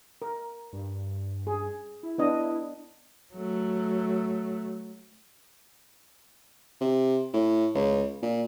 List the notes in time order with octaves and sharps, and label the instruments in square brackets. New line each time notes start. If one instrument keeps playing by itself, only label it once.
[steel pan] A#4
[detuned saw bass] G2
[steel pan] G#4
[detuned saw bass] E4
[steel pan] B3 D4 D#5 [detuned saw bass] E4
[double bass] F#3 A3
[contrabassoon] C3
A2
C#2
A#2